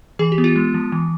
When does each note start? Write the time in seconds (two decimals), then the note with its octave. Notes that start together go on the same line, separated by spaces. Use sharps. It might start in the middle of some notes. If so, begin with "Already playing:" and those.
0.19 E3 G#4
0.32 G4
0.38 B3
0.44 F4
0.56 G#3
0.74 F3
0.92 E3